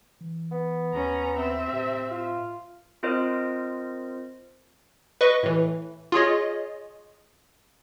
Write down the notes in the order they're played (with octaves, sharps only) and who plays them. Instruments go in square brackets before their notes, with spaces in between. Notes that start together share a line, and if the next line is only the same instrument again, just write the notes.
[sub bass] E3
[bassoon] B3
[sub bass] D#2 [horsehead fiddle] C#4 A#5
[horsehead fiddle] C4 E5
[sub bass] A2 [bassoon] C3
[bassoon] F4
[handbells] C4 F4 A#4 C5 D#5
[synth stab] B4 D#5 C#6
A2 E3
F4 G#4 C#5 D#5